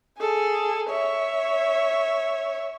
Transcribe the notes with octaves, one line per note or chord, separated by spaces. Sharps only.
G#4 A4
C#5 E5